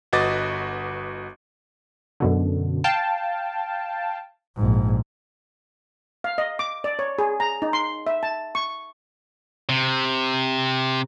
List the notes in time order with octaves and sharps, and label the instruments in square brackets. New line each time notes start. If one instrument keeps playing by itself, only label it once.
[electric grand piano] G1 F#4 B4 D#5 D6 A6
[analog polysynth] F#2 B2 D3
F5 G5 A5
[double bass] A#1 G#2
[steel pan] F5
D#5
D6
D5
C#5
G#4
A#5
D#4
C6
E5
A5
C#6
[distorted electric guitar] C3